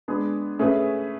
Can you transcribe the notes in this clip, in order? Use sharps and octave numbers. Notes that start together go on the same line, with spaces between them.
G#3 B3 D4 G#4
A3 C#4 G#4 B4 E5